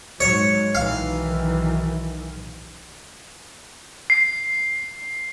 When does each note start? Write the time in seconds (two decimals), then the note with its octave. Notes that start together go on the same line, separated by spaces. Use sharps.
0.20 G#2 F#3 C#5
0.75 B1 D#3 E3 F5
4.10 C7